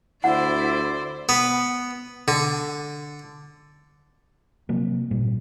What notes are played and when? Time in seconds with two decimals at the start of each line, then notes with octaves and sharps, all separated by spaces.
0.24 D2 E4 C5 D5 F#5
1.29 B3
2.28 D3
4.69 C3 F3 F#3 A#3
5.11 G#1 A#2 G3